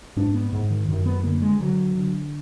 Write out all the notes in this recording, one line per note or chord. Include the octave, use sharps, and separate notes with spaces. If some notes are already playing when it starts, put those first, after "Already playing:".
G#2 D4
B3
G#2
D#3
F#2 D#3
B3
D3 A#3
G#3
D3 F#3
D3